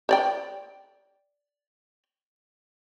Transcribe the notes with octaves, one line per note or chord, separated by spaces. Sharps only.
C5 D5 G5